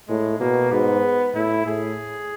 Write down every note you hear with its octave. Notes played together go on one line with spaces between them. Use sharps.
A2 G#3
B2 A#3
G#2 B3
A2 E4
A2 G#4